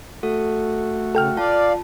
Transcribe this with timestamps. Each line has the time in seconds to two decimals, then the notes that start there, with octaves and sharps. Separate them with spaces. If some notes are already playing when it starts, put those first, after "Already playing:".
0.23 A3 F#4 A4
1.15 C#3 A4 G5 F6
1.37 F4 D5 F5 A5